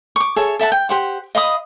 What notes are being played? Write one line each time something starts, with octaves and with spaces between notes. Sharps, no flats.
C#6 D6
G#4 A4 C#5 E5
A4 E5 F#5 A5
G5
G4 C5 F#5
D#5 F5 B5 D#6